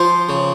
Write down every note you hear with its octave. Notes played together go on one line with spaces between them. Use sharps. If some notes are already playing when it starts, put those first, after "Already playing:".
Already playing: F3 C5
C#3